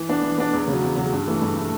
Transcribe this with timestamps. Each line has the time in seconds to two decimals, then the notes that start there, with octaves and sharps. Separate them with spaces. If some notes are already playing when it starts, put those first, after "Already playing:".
Already playing: E3
0.09 B3 D4
0.23 E3
0.38 B3 D4
0.53 E2
0.68 C#3 F#3
0.83 E2
0.97 C#3 F#3
1.12 G2
1.27 E3 A3
1.42 G2
1.57 E3 A3